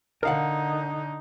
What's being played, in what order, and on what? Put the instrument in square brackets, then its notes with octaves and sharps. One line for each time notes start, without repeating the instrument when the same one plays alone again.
[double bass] D3 D#4 [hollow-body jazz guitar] A#4 F5 F#5